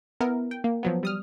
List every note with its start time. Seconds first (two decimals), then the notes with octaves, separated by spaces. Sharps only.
0.21 B3 E4 A#4
0.51 G5
0.64 A#3
0.83 F3 F#3 B3
1.03 G3 D#6 F6